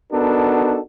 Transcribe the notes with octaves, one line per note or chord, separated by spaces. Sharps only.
B3 D4 D#4 F#4 A4 A#4